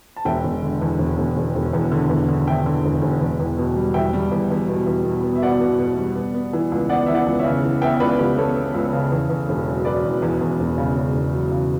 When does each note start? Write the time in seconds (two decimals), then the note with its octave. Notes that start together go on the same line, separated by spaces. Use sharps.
0.16 A5
0.25 E1 E5 G5
0.44 E1
0.62 D3
0.81 E2
0.99 E1
1.18 E1
1.37 E1
1.55 E1
1.73 E2
1.91 D3
2.09 E2
2.28 D3
2.47 D3 E5 G5
2.66 D3
2.84 E1
3.02 E1
3.21 E2
3.39 E2
3.58 B2
3.76 G3
3.94 E2 E5 G5
4.13 G3
4.32 E2
4.50 E2
4.68 B2
4.87 E2
5.05 B2
5.23 B3
5.35 E5
5.42 B2 D5 F#5
5.60 B2
5.79 B2
5.97 G3
6.16 B3
6.34 B3
6.53 E3
6.72 C#2
6.89 B3 D5 F#5
7.06 E3 E5
7.14 D5 F#5
7.27 C#2
7.39 C#5 E5
7.45 C#3
7.64 E3
7.82 B3 E5 G5
8.00 C#2 B4 D5
8.19 C#2 G4 B4
8.37 B3 A4 C#5
8.55 B3
8.74 C#2
8.93 C#3
9.12 E2
9.29 E2
9.49 E1
9.67 F#3
9.85 F#3 B4 D5
10.04 E2
10.22 E2
10.41 E2
10.60 E1
10.78 C#3
10.96 C#3
11.15 E1
11.33 F#3
11.51 C#3